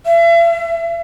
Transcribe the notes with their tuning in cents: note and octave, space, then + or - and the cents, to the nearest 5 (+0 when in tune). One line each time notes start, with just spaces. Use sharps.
E5 +40